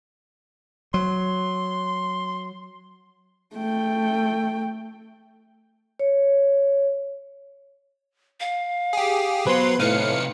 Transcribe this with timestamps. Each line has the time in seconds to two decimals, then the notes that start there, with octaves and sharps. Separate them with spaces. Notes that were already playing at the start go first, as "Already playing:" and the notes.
0.94 F#3 C6
3.56 A3 G5
5.99 C#5
8.40 F5
8.93 G4 G#4
9.47 F#3 B3 B4 C5 C6
9.80 A2 C3 D#4 B4 F5 C#7